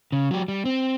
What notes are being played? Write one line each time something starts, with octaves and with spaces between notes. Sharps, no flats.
C#3
F#3 G4
G3
C4